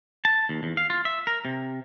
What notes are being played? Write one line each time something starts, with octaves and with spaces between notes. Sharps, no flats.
A5
D#2
E2
F5
F4
E5
A#4
C3